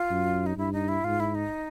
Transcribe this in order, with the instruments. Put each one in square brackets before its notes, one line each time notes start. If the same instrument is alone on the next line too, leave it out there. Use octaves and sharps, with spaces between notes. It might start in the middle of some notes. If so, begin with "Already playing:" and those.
Already playing: [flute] F4
[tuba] F#2
[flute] D#4
[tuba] G2 [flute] E4
[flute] D#4
E4
[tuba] G#2 [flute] F4
[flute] E4
D#4